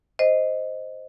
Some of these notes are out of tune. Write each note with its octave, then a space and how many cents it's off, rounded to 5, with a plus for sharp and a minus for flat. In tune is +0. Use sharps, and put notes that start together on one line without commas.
C5 +0 D#5 +0